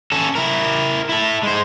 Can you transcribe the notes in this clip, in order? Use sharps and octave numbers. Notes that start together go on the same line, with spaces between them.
C#4 A4
E4 A#4
E4 A4
G#3 C5